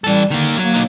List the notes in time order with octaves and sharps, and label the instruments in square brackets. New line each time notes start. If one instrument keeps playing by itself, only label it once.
[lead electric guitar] E3 A4 [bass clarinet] G3
[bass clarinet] D3 [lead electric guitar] D#3 A#3
[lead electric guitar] F#3 [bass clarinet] A#3
[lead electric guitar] F#3 D#4